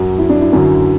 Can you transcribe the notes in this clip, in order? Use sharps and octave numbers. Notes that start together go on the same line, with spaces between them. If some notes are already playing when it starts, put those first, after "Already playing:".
Already playing: F#2 F#3 F#4
E4
D4
E4
F#2 D3 F#3